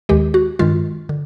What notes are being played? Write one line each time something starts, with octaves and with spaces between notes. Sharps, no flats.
D#2 D#3 G#3 G4
F#4
G2 D#3 G#3 F4
D3